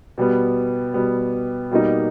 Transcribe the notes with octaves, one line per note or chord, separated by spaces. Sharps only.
B2 G3 B3
B2 G3 B3
B2 G3 A#3 D#4